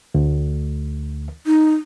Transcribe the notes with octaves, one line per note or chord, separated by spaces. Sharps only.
D2
D#4